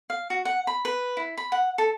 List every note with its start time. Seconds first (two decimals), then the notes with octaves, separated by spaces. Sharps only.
0.10 F5
0.30 F#4
0.45 F#5
0.67 B5
0.85 B4
1.17 E4
1.37 B5
1.52 F#5
1.78 A4